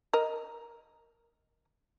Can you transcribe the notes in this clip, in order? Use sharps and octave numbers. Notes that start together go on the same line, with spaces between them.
A#4 D#5